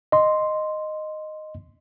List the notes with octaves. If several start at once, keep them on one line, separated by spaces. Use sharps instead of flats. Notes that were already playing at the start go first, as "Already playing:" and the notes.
D#5 C6